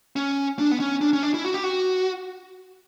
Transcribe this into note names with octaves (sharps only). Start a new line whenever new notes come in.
C#4
D4
B3
C#4
D4
C#4
D4
E4
F#4
G4
F#4